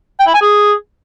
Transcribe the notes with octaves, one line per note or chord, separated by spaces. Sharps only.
G5
E4
G#5
G#4